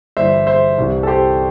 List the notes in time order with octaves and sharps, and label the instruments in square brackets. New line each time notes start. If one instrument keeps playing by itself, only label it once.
[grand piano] G1 G2 E3 C5 E5
C5 E5
C2 C3 E3
A4
G4 C5